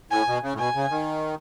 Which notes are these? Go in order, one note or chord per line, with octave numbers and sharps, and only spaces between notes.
A2 G#5
B2
C#3
A2
B2 G#5
C#3
D#3